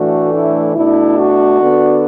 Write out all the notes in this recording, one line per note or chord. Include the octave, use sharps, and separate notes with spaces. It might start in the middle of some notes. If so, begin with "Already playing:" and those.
Already playing: A2 E3 A3 D4 F#4
E4
B2 A3 D4 E4
F#4
D3 B3 D4